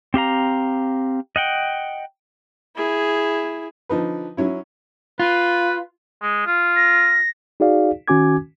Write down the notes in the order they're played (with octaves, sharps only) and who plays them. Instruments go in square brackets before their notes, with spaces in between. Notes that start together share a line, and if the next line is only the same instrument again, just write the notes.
[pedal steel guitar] C4 G4 F5 A#5
D#5 F#5 G5
[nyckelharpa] E4 G#4
[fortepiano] D3 F3 D#4 B4
F#3 C#4 E4
[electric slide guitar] F4 [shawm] B4
[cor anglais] G#3
F4
[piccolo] A#6
[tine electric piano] D#4 F#4 G#4 D5 F5
D#3 C#4 F#4 G#5 D6 G#6